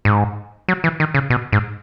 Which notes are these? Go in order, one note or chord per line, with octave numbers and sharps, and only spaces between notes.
G#2
F#3
E3
D#3
C#3
B2
G#2